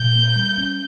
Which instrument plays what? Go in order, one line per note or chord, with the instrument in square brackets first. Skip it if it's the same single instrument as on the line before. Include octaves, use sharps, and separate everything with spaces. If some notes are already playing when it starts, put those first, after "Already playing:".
Already playing: [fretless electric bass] A#2 [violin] G6
[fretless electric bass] A#3
G3
C#4